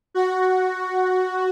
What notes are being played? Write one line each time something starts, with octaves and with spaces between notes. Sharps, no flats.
F#4